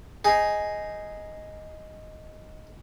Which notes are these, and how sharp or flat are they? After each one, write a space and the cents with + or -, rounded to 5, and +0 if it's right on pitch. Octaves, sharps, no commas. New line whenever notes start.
D#4 +0 G#4 +0